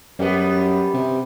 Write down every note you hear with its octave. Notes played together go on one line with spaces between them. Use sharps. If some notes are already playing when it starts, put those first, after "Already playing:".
F#2 G3 B3
C3